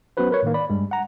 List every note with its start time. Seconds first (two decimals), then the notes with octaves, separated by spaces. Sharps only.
0.17 F#3 B3 C#4 F#4 B4 C5
0.31 A#4 B4 C#5
0.43 A2 D#3 A#3
0.54 D5 B5
0.70 G2 G3 G#3
0.91 F#5 A#5